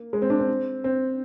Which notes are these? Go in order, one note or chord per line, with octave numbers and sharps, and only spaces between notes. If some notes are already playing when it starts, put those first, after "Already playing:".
Already playing: A#3
G#3
C4
D4
C4
C4